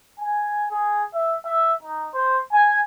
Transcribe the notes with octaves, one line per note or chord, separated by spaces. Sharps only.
G#5
G#4
E5
E5
D#4
C5
G#5